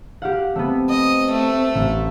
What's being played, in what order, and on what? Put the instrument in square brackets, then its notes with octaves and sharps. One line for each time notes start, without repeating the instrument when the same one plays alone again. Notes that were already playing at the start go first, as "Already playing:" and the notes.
[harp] G4 F5 F#5
[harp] A3 B3 [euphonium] C4
[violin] D#5
A3
[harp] A1